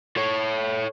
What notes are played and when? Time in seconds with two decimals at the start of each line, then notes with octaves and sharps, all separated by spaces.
0.17 A4 C#5